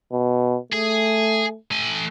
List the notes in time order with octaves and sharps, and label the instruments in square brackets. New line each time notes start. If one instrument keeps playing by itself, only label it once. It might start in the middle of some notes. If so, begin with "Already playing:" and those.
[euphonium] B2
[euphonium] A3 [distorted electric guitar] G#4
[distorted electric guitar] A3 G#5